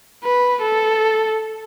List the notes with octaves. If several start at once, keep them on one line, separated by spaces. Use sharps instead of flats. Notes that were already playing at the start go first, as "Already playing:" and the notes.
B4
A4